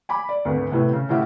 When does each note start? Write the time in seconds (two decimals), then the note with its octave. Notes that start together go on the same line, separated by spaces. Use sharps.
0.09 G#5 B5 D6
0.29 D5
0.45 G#1 D2 B3
0.71 A2 C3 B3
0.93 C#3
1.09 A2 C#3 G4 E5 F#5